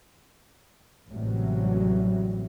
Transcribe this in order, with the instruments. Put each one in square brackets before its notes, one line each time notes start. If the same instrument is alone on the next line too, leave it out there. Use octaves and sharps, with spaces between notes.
[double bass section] A1 A2 C3 E3 F#3 G3